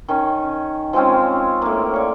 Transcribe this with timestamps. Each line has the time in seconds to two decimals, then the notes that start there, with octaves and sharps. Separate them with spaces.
0.08 D#3 C#4
0.93 F3 G#3 C4 C#4
1.62 A2 A#3
1.94 C#5 D5